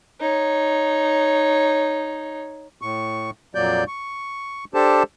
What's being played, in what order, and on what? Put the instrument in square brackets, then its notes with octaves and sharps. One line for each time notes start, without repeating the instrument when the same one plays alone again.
[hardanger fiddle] D#4 C#5
[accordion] A2 C#6
F2 A#2 F#3 A#3 D5 G6
C#6
D4 G4 A4 C5 A5